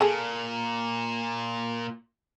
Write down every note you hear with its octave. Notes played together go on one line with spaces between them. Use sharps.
A#2 G#4 A4